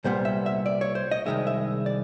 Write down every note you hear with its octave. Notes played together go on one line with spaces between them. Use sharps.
C2 A#2 G3 B3 C5
E5
E5
D5
C#5
C5
D#5
C2 C3 D#3 G#3 E5
E5
D5